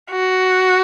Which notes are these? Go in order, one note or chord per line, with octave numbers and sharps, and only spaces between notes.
F#4